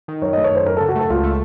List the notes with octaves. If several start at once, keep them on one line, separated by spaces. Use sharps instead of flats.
D#3
F#2 C#5
A3 D#5
C#5
F#2 C5
F#2 A#4
C#3 A4
F#4
A3 A4
C#2 F4
A3